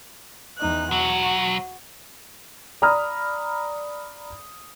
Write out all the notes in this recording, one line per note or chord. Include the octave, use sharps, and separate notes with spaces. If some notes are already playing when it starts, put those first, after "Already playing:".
E2 D#4 F#6
B1 F#3 F#4
D5 A#5 B5 D#6 F6